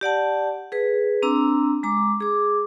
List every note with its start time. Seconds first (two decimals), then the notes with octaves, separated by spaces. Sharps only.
0.01 G4 D5 F#5 A5
0.72 G#4 B4
1.22 C4 D4 A#5 E6
1.83 G#3 A#5 D6
2.20 G#4 D6